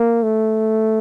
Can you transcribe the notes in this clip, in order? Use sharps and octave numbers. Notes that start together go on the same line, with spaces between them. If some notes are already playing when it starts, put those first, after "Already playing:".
Already playing: A#3
A3